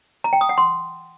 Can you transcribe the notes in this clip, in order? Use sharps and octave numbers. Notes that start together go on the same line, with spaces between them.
A#5
G5
D#6
F#5
C6